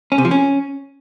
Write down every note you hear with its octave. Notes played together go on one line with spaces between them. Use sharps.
C#4
C3
F3
C#4